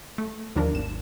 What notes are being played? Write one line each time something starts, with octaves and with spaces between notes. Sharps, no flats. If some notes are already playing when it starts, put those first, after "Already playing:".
A3
D#2 D#3 F3 D4 A#4
G#1 E7